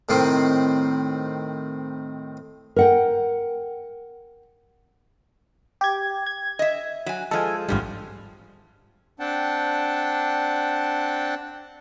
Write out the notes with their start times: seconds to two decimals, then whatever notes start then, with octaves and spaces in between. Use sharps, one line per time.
0.09 A2 D#3 C4
2.76 A#4 F#5 G5
5.81 G4 G#6
6.26 G#6
6.59 D#5 E5
7.06 F#3 G#5
7.31 F3 G#3 A4 G#5
7.69 G#1 E2 G2 F3 G3
9.20 C4 D4 F#5 G5 A5